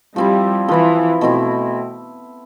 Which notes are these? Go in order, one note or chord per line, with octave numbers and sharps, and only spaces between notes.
F3 G3 C4 E4
E3 F3 C4 E4
B2 A3 C4 E4